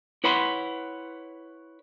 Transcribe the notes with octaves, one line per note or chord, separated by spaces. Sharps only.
E4 B4 C#5 F#5 B5 C6